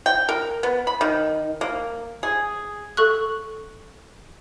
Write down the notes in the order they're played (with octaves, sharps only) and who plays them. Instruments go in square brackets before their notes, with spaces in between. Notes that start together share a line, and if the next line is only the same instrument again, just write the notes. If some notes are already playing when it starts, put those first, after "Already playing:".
[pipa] G5
A#4
B3
B5
D#3
A#3
G#4
[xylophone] A4 C#6 F#6